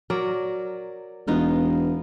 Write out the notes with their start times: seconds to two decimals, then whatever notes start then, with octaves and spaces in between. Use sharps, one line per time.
0.10 F#3 A#4 D5
1.27 E1 B3 D#4 F4